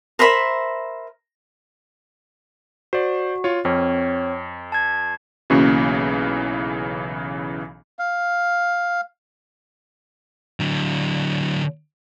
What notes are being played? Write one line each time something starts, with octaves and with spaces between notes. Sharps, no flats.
A#4 C5 E5 B5
F#4 C5 D5
F4 C#5
F2 C4 C#5
A5 G#6
B1 C#3 E3 A#3 C#4 F#4
F5
D3 F#3